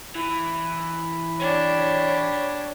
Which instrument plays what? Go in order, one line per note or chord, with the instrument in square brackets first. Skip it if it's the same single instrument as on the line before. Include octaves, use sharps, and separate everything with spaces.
[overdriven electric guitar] E3 [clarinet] B5
[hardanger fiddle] D4 G4 [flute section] C#5